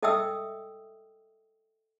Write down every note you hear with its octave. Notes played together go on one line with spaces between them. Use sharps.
A4 D#5 E5 G5 D#6 E6